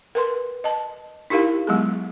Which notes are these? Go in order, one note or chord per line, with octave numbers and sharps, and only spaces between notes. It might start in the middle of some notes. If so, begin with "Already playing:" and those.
A#4 B4 C6
D#5 A5
D#4 E4 G4 A#4 F5
F#3 G#3 B3 G#4